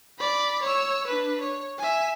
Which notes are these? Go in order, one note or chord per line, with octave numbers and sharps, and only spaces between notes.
D5 B5
C#5 E6
D4 B4
C#5
E5 G#5